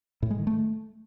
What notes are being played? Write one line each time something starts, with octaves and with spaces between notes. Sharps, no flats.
A2
G#3
D#3
A3